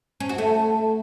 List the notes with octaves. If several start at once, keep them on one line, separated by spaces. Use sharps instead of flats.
C#4
F#4
A3